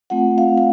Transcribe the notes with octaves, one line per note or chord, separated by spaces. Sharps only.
A3 C4 F4 F#5
F5
F5